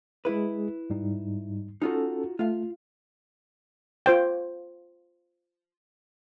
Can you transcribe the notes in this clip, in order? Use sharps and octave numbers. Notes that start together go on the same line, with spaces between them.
G#3 E4 G#4 B4
G#2 G3 D#4
C#4 D#4 F4 F#4 A4
A3 F4 F5
F4 C5 G5